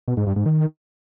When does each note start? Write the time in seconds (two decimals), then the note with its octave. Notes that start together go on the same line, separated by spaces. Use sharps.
0.08 B2
0.17 G#2
0.27 G2
0.36 G#2
0.46 D#3